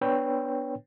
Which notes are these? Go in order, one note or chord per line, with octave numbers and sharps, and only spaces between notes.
B3 D4 B4 C#5 G5